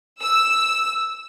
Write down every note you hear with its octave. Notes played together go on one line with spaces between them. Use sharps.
E6